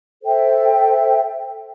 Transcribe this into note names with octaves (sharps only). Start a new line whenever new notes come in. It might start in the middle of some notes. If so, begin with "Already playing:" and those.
A4 C5 E5 G5